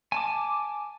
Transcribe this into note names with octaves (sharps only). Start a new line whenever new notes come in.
G#5 A5 D6